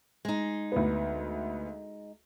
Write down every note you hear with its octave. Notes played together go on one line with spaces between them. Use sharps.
G#3 D#4
D2 B3